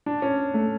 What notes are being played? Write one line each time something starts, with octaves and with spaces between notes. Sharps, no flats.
D4
C#4
A3